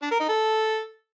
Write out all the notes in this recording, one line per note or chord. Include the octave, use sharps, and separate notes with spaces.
D4
A#4
D#4
A4